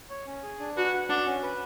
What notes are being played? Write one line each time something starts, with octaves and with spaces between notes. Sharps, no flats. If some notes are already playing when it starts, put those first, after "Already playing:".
C#5
C#4
G#4
D4
F#4 B4
F#5
D4 F#4
C#4
B4